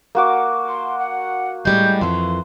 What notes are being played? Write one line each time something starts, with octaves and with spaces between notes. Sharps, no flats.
A#3 F#4 D6
C6
F#5
A2 G3 G#3 G6
F2 E3 C6